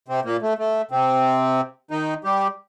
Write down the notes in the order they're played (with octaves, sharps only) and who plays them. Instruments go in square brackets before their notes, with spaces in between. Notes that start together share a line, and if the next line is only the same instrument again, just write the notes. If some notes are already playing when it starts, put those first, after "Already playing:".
[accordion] C3 C4
A#2 A#3
A3
A3
C3 C4
D#3 D#4
G3 G4